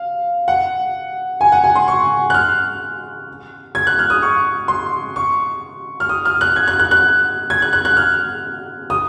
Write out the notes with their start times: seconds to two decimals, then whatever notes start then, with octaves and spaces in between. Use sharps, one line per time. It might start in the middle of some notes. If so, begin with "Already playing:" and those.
Already playing: F5
0.48 F#5
1.41 G#5
1.52 F#5
1.64 G#5
1.75 C6
1.88 C#6
2.30 F#6
2.34 F6
3.75 G#6
3.87 F#6
3.99 F6
4.10 D#6
4.22 C#6
4.68 C6
5.16 C#6
6.00 F6
6.09 D#6
6.25 F6
6.41 F#6
6.56 G#6
6.68 F#6
6.79 F#6
6.91 F#6
7.50 G#6
7.62 F#6
7.73 F#6
7.85 F#6
7.97 F6
8.90 D#6